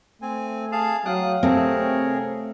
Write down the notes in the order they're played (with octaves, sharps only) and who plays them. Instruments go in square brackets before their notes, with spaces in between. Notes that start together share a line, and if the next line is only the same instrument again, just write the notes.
[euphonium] A3 [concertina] C4 G#5
[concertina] G#4 F5 A5
[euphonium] F#3 [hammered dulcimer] F5 G5 [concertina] D#6 F#6
[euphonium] C3 [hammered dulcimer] A3 [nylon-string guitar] C4 [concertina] G#4 A#4 C#5